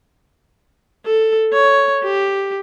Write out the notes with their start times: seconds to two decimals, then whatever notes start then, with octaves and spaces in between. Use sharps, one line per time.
1.05 A4
1.53 C#5
2.04 G4